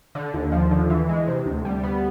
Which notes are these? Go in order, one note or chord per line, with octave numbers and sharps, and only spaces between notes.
D3
D#2
F3
D3
E3
G#3
C3
D2
G3
B3